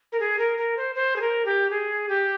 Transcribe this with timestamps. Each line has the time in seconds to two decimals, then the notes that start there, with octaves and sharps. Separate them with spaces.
0.12 A#4
0.20 G#4
0.39 A#4
0.58 A#4
0.77 C5
0.95 C5
1.16 G#4
1.21 A#4
1.45 G4
1.71 G#4
2.09 G4